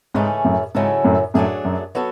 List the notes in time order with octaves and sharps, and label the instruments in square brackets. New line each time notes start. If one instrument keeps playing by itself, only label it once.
[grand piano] G#2 [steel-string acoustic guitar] C#3 E3 A3 C#4 G#4
[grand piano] F#2 A2
[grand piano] G#2 [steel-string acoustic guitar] C#3 F#3 C#4 E4 A4
[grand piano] F#2 A2
[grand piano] F#2 A2 [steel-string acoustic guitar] F#3 A3 D4 G#4
[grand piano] F#2
[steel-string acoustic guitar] F#3 B3 F#4 A4